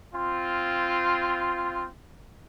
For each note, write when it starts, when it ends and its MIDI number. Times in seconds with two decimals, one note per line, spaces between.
0.14 1.87 60
0.14 1.87 65